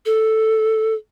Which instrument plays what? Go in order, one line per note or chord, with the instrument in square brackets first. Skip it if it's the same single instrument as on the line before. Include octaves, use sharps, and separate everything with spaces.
[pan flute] A4